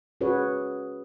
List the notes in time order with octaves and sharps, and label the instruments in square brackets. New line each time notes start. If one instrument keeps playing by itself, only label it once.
[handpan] C#4 F#4 G#4 B4 C#5